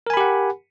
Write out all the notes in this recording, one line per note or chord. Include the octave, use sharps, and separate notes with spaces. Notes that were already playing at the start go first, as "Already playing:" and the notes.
G4 A#4 F#5 G#5 B5